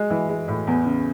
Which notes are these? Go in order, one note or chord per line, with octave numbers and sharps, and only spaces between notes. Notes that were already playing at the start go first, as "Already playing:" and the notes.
Already playing: G#3
E3
G#3
A2
E2
C#3